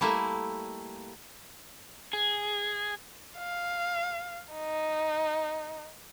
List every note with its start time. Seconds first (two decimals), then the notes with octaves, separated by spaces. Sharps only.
0.01 G3 A3 A#3 E4
2.13 G#4
3.38 F5
4.53 D#4